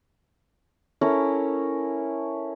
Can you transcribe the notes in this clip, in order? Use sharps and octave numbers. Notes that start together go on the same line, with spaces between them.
C#4 E4 A4 A#4